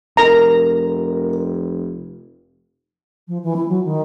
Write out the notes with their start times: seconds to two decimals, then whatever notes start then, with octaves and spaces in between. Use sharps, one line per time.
0.17 F1 A#4 A#5
3.28 F3
3.43 E3
3.56 E4
3.68 F#3
3.84 D#3